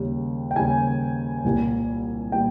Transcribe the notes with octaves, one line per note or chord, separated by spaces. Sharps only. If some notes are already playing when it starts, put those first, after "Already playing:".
Already playing: D#2 C#3 G3
G5
D#2 C#3 G3 G#5
C2 A#2 G3 A#3
A#2 G3 A#3 G5